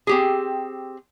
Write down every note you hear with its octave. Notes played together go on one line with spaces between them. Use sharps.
C4 G4 G#4